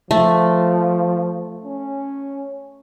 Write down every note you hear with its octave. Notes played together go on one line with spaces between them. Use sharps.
F3 A3
C#4